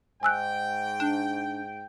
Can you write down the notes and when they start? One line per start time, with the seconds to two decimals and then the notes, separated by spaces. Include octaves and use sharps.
0.23 G#2 G5 G#5 E6 F#6
1.00 D4